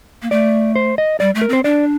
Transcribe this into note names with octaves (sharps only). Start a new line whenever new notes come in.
A#3
A3 D5
C5
D#5
G3 D5
A3
A#4
C4 C5
D4 D5